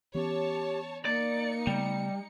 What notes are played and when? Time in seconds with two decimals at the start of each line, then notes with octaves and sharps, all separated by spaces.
0.15 E3 B3 C#4 G4 C#5 A5
1.05 A#3 D#4 D5 C#7
1.67 C#3 G3 A3 B3